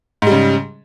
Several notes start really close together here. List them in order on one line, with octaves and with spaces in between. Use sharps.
G#2 G3 C#3